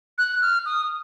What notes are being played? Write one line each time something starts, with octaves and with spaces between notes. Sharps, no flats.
F#6
F6
D#6